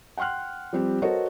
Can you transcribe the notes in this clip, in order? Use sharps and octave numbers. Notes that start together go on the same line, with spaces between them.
F#5 G5 C6 F6 F#6
F3 G3 C4 G4
F#4 A4 A#4 C5 C#5 D#5